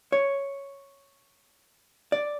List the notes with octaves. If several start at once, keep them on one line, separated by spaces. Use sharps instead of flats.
C#5
D5